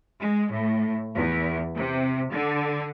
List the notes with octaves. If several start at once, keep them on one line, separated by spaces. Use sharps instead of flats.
G#3
A2
E2
C3
D3